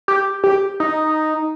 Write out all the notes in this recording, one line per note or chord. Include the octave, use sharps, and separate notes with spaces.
G4
G4
D#4